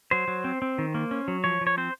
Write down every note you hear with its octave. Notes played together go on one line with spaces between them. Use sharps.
F#3 C5
F#3
C4
C4
D#3
A#3
C#4
F#3
F3 C#5
F3
C#5
C4 C5